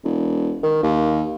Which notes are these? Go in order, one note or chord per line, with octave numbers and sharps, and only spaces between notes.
E1
D#3
D#2